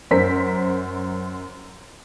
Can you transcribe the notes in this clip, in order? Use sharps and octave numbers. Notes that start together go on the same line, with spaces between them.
F#2 A#4 C5 B6